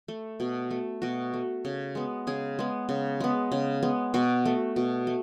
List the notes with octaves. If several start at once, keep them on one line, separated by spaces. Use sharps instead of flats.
A3
B2
A3
B2 F#4
A3
C#3
G#3 B3
C#3 G#4
G#3 B3
C#3
G#3 B3
C#3
G#3 B3
B2 F#4
A3
B2
A3